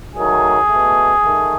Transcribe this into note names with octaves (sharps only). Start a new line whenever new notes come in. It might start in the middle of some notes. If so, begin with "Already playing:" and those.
D#3 F#3 A3 G#4
B2 A3
D#3 A3